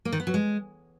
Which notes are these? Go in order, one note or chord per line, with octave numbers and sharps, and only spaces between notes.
A#3
D#3
B3
F#3
G#3